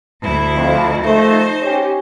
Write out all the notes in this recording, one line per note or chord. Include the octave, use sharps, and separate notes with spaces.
D2 E4
F2
D#3 F3 A3 D#4 C5
C#4 G4